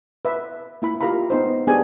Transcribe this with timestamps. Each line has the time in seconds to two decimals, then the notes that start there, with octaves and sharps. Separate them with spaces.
0.25 B4 E5
0.82 A#3 E4 B5
1.01 F4 G4 A#4 F5 A#5 B5
1.30 B3 D#4 C5
1.67 B3 D4 G4 G#4 G#5